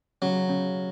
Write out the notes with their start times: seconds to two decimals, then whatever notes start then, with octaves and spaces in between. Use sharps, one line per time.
0.22 C#3 F#3
0.49 C#3